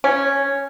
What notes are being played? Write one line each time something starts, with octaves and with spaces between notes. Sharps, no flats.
C#4